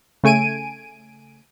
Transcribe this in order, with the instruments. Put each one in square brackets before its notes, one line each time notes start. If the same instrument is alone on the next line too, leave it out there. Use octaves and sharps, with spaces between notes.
[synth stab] C#3 A3 G#5 D7 D#7